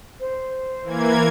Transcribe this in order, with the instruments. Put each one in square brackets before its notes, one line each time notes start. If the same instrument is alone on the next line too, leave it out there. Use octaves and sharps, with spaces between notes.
[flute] C5
[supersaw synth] E3 A#3 G#6